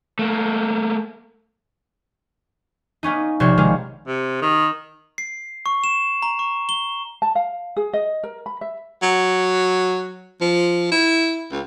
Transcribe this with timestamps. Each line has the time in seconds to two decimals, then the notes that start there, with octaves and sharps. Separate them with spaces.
0.19 A3 A#3
3.03 A#3 B3 C#4 D#4
3.40 A#1 C3 C5 C#5
3.58 D#3 G#3 A#3 C#4
4.07 C3
4.42 D#3
5.18 C7
5.66 C#6
5.84 E7
6.22 A#5
6.39 C#6
6.69 G7
7.22 A5
7.35 F5
7.76 G#4
7.93 D#5
8.23 A#4
8.46 B5
8.61 E5
9.02 F#3
10.41 F3
10.92 E4
11.52 C#2